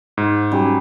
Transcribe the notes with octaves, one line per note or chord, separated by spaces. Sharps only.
G#2
F#3 G3 C#4